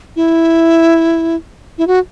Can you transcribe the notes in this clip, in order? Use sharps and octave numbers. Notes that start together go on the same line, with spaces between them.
E4
E4
F#4